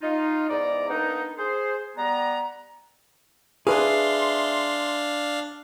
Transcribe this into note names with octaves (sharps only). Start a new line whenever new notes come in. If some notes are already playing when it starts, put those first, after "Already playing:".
D#4 F4
E2 G#2 D5 A#5
A#3 B3 D4 D#4
G#4 C5
G3 B3 A#5
D4 G#4 B4 E5 F5 C6